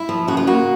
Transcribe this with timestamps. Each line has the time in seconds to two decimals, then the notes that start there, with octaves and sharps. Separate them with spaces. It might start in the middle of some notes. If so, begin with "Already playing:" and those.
Already playing: E4
0.09 F3
0.28 C#3 F#4
0.37 F4
0.47 A#3 F#4